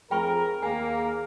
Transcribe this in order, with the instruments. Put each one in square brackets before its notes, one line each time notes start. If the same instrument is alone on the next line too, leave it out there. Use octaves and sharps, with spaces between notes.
[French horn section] F2 F3 G#4 [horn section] A#4 [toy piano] G5 B5 C#6
[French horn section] D#2 G#4 [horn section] A#3 [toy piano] G#5